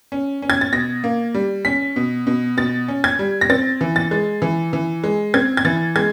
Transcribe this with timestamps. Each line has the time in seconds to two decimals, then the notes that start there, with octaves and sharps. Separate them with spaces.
0.12 C#4
0.42 C#4
0.50 G#6
0.61 A6
0.73 B2 A#6
1.04 A#3
1.34 G3
1.65 C#4 B6
1.96 B2
2.27 B2
2.57 B2 A6
2.88 C#4
3.04 G#6
3.19 G3
3.41 A#6
3.50 C4 A6
3.81 E3
3.96 A6
4.11 G#3
4.42 E3
4.73 E3
5.04 G#3
5.34 C4 G#6
5.57 G#6
5.65 E3 A6
5.96 G#3 G#6